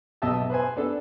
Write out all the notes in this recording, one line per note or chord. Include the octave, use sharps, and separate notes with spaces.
B1 B2 D#5 E5 A5 E6
B4 C5 G#5
B3 D4 A4